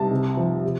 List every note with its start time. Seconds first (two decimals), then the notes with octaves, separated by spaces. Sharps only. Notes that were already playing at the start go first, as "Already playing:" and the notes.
Already playing: C2 A5
0.11 C3
0.37 F3
0.64 C3